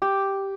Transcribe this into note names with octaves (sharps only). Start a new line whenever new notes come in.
G4